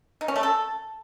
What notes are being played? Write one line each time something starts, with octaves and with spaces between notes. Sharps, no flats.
D#4
C#4
A3
A4